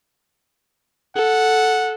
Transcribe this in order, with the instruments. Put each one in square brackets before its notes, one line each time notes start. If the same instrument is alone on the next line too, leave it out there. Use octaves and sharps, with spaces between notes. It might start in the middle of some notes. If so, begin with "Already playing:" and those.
[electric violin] A4 [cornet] F#5